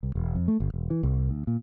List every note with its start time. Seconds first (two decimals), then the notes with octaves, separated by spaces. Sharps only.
0.03 C2
0.15 E1
0.35 F2
0.48 A3
0.60 G1
0.74 E1
0.90 E3
1.03 C2
1.30 D2
1.47 A#2